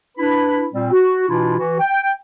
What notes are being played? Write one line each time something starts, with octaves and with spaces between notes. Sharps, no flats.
D4 E4 B4 B5
A#2 G3 C4
F#4
B2 E3 D4 E4 F4
E3 F#4
G5